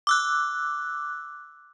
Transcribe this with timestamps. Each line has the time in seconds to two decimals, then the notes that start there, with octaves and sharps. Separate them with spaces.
0.07 D6 E6 F#6